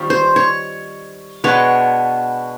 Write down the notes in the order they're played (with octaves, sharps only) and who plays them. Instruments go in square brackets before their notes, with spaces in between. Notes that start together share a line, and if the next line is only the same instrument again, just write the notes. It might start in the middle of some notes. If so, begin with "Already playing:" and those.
Already playing: [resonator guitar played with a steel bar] D#3 G3 C4 F4
[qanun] C5
C#5
[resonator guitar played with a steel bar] B2 G#3 B3 D4 [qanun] C#5